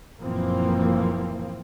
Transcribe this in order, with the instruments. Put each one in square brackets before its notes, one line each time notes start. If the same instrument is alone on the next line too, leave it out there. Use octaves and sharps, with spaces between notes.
[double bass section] F#1 A#2 E3 F3 A#3 C4